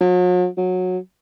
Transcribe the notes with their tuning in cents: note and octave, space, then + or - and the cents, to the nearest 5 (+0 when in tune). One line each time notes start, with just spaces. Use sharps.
F#3 -45
F#3 -15